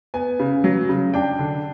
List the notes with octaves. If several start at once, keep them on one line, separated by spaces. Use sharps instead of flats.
B3 G#5
C#3
F#3
C#3
D4 G5
D3